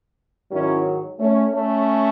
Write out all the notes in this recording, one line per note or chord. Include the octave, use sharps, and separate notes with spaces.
G#2 D#3 F#3 C#4 E4
A3 C#4
A3 C#4